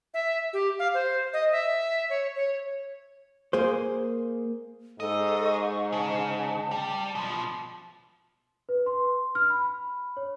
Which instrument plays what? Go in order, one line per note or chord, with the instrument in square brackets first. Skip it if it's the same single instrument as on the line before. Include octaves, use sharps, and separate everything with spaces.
[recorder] E5
G4
F5
C5
D#5
E5
C#5
C#5
[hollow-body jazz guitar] A#3 G#4 C5
[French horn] G#2 [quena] A4 [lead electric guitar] D#5
[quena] C#6
[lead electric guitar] C#3 [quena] A5
[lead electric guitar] G3
B2 F3
[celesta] B4
C6
F6
B5
C#5